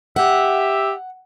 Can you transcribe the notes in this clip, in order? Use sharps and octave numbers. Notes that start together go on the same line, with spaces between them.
G4 E5 F#5